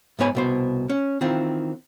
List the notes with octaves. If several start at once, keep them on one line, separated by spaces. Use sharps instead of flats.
G#2 G#3 B3 C#5 G#5 B5
C2 B2 C5
C#4
D#3 E3 C4 F4